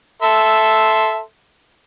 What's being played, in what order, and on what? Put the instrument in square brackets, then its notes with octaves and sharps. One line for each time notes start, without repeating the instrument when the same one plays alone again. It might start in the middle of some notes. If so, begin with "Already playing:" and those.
[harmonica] A4 E5 C6